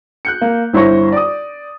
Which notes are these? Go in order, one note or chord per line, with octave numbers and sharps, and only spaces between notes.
F#6 G6 C#7
A#3
G1 E4 C5 C#5 C#6 A#6
D5 D#6